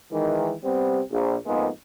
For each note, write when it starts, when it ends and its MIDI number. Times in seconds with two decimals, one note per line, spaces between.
0.12 0.54 51
0.12 0.54 52
0.12 0.54 56
0.64 1.01 48
0.64 1.01 55
0.64 1.01 59
0.64 1.01 60
1.12 1.35 34
1.46 1.68 41
1.46 1.68 44
1.46 1.68 56
1.46 1.68 58
1.46 1.68 59
1.46 1.68 63